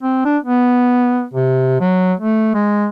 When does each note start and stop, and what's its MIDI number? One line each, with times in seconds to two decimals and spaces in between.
0.03 0.22 60
0.25 0.38 62
0.43 1.25 59
1.34 1.79 48
1.81 2.13 54
2.20 2.54 57
2.54 2.86 56